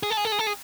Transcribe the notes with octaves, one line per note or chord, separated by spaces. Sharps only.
G#4
A4
G#4
A4
G#4
A4
G#4